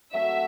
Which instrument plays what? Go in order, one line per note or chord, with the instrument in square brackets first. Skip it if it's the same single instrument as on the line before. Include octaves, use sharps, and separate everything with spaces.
[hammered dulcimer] F#3 A3 C4 F#4 [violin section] E5